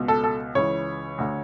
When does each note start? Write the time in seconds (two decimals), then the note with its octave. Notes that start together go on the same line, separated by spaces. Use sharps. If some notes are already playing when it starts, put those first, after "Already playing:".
Already playing: C#2 B2
0.08 A4
0.24 A4
0.55 C#2 C#3 E3 C#5
1.18 D2 D3